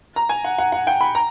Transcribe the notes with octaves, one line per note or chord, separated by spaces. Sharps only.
A#5
G#5
F#5
F#5
F#5
G5
B5
A#5